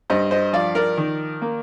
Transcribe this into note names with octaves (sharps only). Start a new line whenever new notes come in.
G2 C5 D#5
C5 D#5
F3 D5 F5
A#4 D5
D#3
A#3